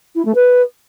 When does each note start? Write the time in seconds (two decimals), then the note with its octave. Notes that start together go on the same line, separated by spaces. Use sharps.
0.16 E4
0.25 A3
0.35 B4